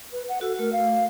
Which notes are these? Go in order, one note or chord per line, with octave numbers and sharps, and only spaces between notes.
B4
F#5
F#4 A4
A3 A#4
F5